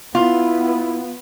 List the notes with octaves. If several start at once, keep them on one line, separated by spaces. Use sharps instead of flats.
B3 E4 F4